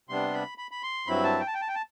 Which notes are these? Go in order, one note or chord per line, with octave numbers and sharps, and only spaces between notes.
C3 G3 B3 D4 C6
B5
B5
B5
C6
G2 F#3 C4 E4 B5
A5
G5
A5
G5
A5
G5
A5